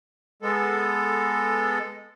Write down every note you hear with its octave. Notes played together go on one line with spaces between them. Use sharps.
G#3 B3 A4